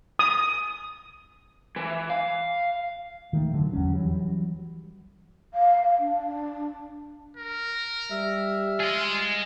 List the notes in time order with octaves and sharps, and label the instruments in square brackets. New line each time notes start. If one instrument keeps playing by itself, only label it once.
[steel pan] D#6
[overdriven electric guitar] E3
F5
[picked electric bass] D#3 A3
D3 F#3
E2 F#3 C#4
E3 F#3 G3
[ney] F5
D4
[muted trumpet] A#4
[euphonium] G3 [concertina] E5 F6
[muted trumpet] F4 [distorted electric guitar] G#4 D#5